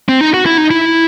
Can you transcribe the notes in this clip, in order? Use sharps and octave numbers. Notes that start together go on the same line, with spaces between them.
C4
D#4
F#4
E4
D#4
E4